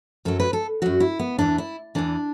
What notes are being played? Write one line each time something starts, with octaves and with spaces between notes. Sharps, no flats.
F#2 F#3 A4
B4
A4
F#2 F#3 F#4
E4
B3
E2 E3 D4
E4
E2 E3 D4